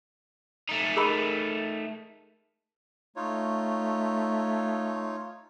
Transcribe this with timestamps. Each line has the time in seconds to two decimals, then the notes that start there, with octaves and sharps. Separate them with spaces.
0.69 A3 D#4
0.96 G#4 A#4 B5
3.16 A3 D#4 F4 C#5